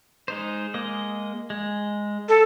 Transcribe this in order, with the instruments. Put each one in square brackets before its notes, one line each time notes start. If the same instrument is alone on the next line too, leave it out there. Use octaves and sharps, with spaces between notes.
[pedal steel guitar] G#3 D#4 C5
G#3 A#3 D#5
G#3
[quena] A4